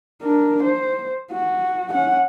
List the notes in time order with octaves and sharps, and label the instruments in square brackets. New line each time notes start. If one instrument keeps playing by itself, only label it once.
[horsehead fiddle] D4 A#4
C5
F#4
C#4 F#5